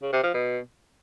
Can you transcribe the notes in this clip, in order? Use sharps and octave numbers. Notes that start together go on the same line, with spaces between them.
C#3
C3
F3
B2